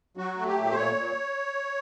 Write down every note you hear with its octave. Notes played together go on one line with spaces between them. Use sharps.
F#3 F#4
A3
G4
A#2
C5
A#2 C#5
A#2